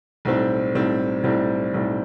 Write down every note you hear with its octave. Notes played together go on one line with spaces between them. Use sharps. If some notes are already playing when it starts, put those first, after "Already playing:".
B1 A2 G3 C4
B1 A2 G3 C4
B1 A2 G3 C4
B1 A2 G3 C4